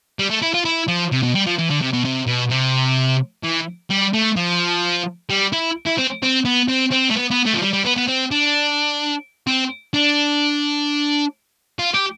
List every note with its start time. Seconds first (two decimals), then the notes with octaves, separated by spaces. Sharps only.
0.19 G3
0.30 A3
0.42 E4
0.54 F4
0.65 E4
0.88 F3
1.12 C3
1.23 B2
1.35 G3
1.46 F3
1.58 E3
1.70 D3
1.81 C3
1.93 B2
2.05 C3
2.28 B2
2.50 C3
3.43 E3
3.90 G3
4.13 A3
4.36 F3
5.30 G3
5.53 E4
5.87 E4
5.99 C4
6.23 C4
6.45 B3
6.68 C4
6.92 C4
7.10 A3
7.15 B3
7.30 B3
7.45 A3
7.54 F3
7.61 G3
7.73 G3
7.85 B3
7.97 B3
8.08 C4
8.31 D4
9.47 C4
9.94 D4
11.79 F4
11.94 G4